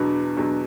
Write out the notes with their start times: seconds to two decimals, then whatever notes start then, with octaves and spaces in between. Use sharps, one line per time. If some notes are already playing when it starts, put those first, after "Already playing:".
Already playing: E2 B2 F#3 B3 D4
0.37 E2 B2 F#3 B3